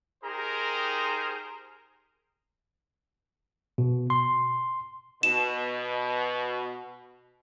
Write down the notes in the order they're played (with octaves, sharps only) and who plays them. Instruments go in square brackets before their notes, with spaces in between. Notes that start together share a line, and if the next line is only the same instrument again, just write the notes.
[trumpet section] D#4 G4 G#4 A#4 C5 A#5
[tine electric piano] B2
C6
[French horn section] B2 [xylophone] E7